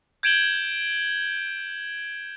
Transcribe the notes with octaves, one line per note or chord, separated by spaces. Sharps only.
G6 G#6 D7 E7 F#7 G7